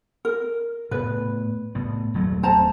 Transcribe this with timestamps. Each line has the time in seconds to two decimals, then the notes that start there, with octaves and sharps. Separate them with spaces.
0.25 A#4
0.91 A2 B3 B4
1.75 A2 B3
2.14 D#1 F#3 A3
2.43 C5 A5 A#5